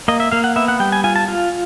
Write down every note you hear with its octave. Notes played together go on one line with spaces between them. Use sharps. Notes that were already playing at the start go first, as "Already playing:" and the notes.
A#3 D#5
E5
A#3 F5
F#5
B3 E5
F#5
G3 G5
G#5
F4 G#5
A5
F4